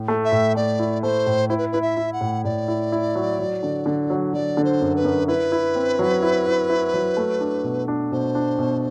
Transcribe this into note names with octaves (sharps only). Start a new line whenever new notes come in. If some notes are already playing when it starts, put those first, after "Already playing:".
Already playing: A2 E4
A3
E5
A2
A3 D5
E4
A3 C5
A2
E4 C5
B4
E4 B4
E5
E4
F#5
A2
A2 D5
E4
E4
F#3
F#3
D3
D3
F#3
F#3 D5
D3
C5
F#2
B4
F#2
E4 B4
E4
C4
F#3
E4
E4
E4
F#3
A3
D4
B2
D4
B2 C5
D4
B2